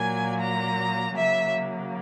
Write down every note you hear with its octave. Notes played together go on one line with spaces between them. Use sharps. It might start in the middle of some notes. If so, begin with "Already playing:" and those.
Already playing: A#2 F#3 A#3 G#5
A#5
C#3 F#3 A#3 E5